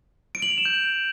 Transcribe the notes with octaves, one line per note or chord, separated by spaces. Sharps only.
D7
F#7
F7
E7
G6